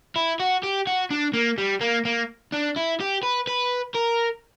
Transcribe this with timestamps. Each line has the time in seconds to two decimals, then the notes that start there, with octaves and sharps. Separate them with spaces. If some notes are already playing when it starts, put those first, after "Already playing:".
0.16 E4
0.40 F#4
0.63 G4
0.87 F#4
1.10 D4
1.34 A#3
1.58 G3
1.81 A#3
2.05 A#3
2.52 D4
2.76 E4
3.00 G4
3.23 B4
3.47 B4
3.94 A#4